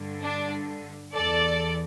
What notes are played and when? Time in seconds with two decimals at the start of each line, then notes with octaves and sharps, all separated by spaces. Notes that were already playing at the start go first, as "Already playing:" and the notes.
Already playing: G2 D3
0.21 D4
1.14 E2 E3 A4 D5